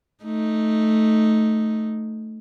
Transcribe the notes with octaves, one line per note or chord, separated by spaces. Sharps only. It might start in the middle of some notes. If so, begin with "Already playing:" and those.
A3 D#4